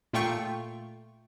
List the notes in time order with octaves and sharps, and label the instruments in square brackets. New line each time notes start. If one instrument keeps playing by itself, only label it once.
[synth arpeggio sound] A#2 A3 F4 G5 C#6